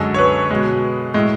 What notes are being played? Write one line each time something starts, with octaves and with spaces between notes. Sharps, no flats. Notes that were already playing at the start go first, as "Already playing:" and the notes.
Already playing: F#2 D3 G#3 A4
C#5
B4
B2 G#3
A2 G#3